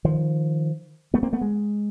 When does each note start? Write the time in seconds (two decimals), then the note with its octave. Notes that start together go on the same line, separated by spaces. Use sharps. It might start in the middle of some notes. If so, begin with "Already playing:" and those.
0.05 D#3 F3
1.14 A3 B3
1.23 A#3 C4
1.33 A3 B3
1.41 G#3